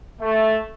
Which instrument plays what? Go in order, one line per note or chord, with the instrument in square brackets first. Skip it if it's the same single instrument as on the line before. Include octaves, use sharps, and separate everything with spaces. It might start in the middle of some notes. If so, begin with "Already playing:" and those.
[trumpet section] A3